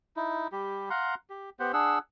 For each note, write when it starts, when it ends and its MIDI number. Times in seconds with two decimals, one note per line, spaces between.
0.16 0.47 63
0.16 0.47 64
0.52 0.89 55
0.52 0.89 67
0.90 1.15 77
0.90 1.15 78
0.90 1.15 82
0.90 1.15 84
1.30 1.50 67
1.60 1.72 59
1.60 1.72 67
1.60 1.72 72
1.60 1.72 78
1.73 1.99 62
1.73 1.99 68
1.73 1.99 78
1.73 1.99 88